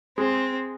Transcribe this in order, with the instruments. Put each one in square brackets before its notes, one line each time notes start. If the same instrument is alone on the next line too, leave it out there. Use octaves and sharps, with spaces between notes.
[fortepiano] G#3 [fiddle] C4